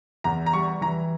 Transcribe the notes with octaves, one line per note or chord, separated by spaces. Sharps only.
E2 A#5
A#5
G3 C#6
E3 A#5